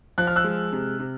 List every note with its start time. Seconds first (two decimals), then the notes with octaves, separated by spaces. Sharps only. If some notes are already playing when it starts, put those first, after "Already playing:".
0.18 F3 F#6
0.27 F6
0.36 E6 F#6
0.44 G#3
0.72 C3
0.99 C3